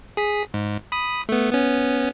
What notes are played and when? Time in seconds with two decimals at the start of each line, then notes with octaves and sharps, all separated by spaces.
0.17 G#4 B6
0.54 G#2
0.92 B5 D#6
1.29 A3 B3
1.53 B3 C#4